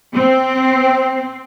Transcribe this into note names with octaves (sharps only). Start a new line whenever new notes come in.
C4